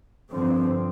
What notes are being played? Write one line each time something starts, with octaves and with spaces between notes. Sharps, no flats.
G2 D3 F3 C4